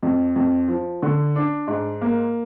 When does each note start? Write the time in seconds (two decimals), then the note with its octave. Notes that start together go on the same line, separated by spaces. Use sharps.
0.03 F2
0.36 F2
0.68 F3
1.02 D3
1.36 D4
1.68 G#2
2.01 A#3